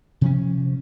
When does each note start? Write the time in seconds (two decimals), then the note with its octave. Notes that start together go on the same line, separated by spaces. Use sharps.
0.21 C3 F3 C#4